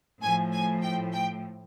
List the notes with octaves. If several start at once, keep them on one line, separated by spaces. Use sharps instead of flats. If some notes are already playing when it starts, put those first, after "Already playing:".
A2 F3 G#5
G#5
G5
G5